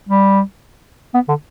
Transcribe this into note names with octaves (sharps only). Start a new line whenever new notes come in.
G3
B3
D3